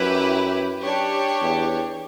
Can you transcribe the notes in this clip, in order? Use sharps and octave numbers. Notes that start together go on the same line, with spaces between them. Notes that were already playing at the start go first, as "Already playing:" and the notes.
Already playing: F#2 E4 G4 B4
D4 G4 C#5
E2